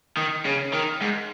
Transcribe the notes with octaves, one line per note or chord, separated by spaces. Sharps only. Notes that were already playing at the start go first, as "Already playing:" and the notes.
D#3
C#3
D#3
G#2